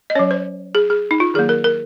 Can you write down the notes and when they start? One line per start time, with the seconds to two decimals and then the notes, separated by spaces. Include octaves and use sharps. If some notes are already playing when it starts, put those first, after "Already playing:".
0.10 D#5
0.15 F#3 C#4 C#5
0.31 C5
0.75 G#4
0.90 G#4
1.11 D#4
1.20 F4
1.34 D#3 F#3 A#3 G#4
1.49 A#4
1.64 A#4